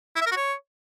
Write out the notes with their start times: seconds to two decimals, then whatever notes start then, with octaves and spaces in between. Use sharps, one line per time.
0.16 E4
0.21 E5
0.26 A#4
0.31 F#4
0.36 C#5